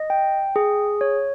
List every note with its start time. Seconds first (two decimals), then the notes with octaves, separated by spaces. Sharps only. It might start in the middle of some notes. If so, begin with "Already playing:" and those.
Already playing: D#5
0.10 G5
0.56 G#4
1.01 C#5